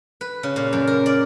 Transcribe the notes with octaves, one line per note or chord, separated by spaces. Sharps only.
B4
C#3
A#2
F#2
A#4
D5